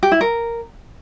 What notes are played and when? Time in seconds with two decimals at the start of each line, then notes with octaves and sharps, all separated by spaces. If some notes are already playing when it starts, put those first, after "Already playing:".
0.03 G4
0.12 E4
0.21 A#4